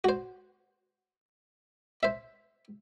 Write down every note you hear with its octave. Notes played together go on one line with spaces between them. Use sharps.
F#4 C5
C5 E5